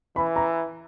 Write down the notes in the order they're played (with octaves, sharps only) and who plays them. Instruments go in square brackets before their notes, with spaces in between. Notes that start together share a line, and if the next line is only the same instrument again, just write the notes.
[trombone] E3 [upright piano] B5
[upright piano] A#5